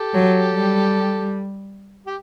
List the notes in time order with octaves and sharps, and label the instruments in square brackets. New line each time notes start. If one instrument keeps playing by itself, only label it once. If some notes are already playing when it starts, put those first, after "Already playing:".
Already playing: [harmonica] G4 A4
[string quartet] F#3
G3
[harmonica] G4